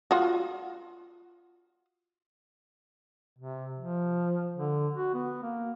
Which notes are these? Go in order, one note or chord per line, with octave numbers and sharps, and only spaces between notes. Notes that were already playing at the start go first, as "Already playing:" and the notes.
F4 F#4
C3
F3
D3
F#4
B3
A#3